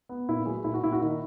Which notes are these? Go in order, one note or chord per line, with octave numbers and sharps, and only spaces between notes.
B3
A#2 E4
F#3 G#4
A#2 E4
F#4
A#2 E4
F#4
D#3 E4